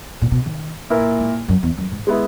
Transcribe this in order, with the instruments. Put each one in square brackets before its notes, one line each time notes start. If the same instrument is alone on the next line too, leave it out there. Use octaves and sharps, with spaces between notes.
[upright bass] A#2
B2
D#3
[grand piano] A#2 A#3 E4 A#4
[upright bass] G#2
F#2
E2
F#2
G#2
[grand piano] G#3 B3 E4